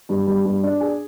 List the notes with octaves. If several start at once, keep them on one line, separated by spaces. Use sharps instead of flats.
G2
G2
G2
D4
G#4